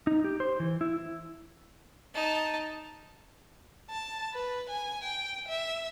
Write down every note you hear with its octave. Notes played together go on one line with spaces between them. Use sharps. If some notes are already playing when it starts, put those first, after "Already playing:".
D#4
G4
C5
E3
E4
D#4 A5
A5
B4
G#5
G5
E5